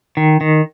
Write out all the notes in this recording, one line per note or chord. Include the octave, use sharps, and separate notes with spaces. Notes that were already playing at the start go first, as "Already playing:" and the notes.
D#3
D#3